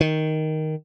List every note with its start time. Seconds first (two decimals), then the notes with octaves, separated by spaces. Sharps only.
0.01 D#3